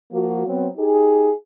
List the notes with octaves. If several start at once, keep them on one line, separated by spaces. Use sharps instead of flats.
F3 A#3 F#4
F#3 B3 C4
D#4 G4 G#4